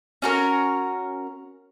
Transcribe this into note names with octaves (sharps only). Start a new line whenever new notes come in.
C#4 F#4 A#4